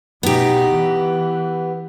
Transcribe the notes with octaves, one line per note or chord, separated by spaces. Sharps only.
B2 B3 D#4 G4
E3